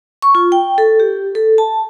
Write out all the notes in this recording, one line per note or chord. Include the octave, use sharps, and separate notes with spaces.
C#6
F4
G5
A4
G4
A4
A5